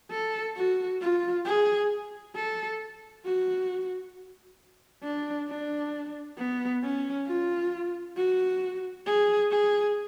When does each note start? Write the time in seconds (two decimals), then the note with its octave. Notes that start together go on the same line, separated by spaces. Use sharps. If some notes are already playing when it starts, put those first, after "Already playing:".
0.11 A4
0.56 F#4
1.01 F4
1.45 G#4
2.36 A4
3.25 F#4
5.03 D4
5.48 D4
6.38 B3
6.83 C#4
7.27 F4
8.17 F#4
9.06 G#4
9.51 G#4